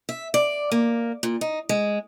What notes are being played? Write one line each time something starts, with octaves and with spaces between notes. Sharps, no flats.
E5
D5
A#3
A#2
D#4
G#3